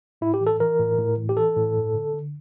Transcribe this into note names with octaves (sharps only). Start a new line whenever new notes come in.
A2 E4
G4
E3
A4
E3 A#4
A2
A2
E3
G4
E3 A4
A2
G2
D3
D3